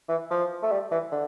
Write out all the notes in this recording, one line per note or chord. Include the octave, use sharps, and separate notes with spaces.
E3
F3
A3
G3
E3
D3